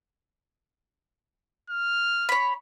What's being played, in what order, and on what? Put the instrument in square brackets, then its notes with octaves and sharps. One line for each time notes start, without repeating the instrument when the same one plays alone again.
[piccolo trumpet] F6
[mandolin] C#5 B5